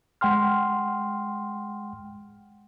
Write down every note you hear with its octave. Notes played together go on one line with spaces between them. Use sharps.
G#3 F#5 G5 C6 F6